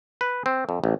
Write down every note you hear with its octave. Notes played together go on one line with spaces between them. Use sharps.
B4
C4
F2
A1